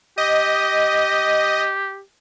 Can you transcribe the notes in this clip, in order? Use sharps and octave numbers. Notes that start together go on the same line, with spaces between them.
G4 D#5